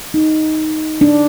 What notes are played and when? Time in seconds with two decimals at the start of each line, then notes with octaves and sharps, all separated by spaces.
0.14 D#4
1.01 D4